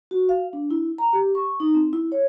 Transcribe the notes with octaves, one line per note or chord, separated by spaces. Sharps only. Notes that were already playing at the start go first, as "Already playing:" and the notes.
F#4
F5
D4
E4
A#5
G4
C#6
D#4
C4
E4
C#5